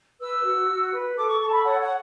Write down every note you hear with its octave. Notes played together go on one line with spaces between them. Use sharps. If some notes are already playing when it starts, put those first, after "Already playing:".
B4 E6
F#4
F#4
B4
A4 D6
C#6
A4 C#6
A5
B5
C#5 F#5
F#5